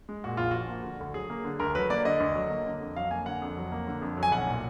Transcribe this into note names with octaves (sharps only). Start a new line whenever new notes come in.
G#3
A#2 F#4
A#1 F4
F3 F#4
A#3
D3
D2
F#3 G#4
A#3
D3
D2 A#4
F#3 B4
A#3 D5
D3 D#5
D2
F#3
A#3
D3
F2
F#3 F5
A#3 G#5
D3 F#5
F2
F#3
A#3
D3
F2
F#3
G#5
B1 F#5
A#2